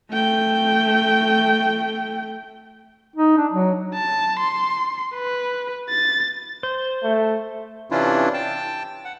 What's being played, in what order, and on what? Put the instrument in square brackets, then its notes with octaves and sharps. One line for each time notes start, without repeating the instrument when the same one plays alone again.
[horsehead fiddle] A3 G5
[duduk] D#4
D4
F#3
[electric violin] A5
C6
B4
A6
[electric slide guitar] C5
[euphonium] A3
[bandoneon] C3 E3 C#4 D4 E4 F4
G5 A5
F#5